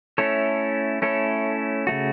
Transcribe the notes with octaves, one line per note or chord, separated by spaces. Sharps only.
A3 C#4 E4 A4 C#5
A3 C#4 E4 A4 C#5
C#3 A3 F#4